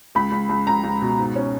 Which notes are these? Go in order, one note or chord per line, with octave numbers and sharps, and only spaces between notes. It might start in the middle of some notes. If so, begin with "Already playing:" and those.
C#2 B5
C#2
C#2
C#2 A#5
C#2
B2
G#2
C#4